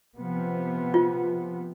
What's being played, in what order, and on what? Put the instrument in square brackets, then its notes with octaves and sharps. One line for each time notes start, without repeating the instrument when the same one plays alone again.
[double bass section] C3 F3 B3
[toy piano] F4